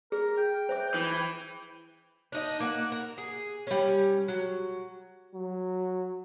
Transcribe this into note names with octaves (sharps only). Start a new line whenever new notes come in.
G#4 A#4
G5
C5 E5 D6
E3
D4 D#4 D#5
A#3 F#5
A#4
G#4
G3 C#4
F#3
F#3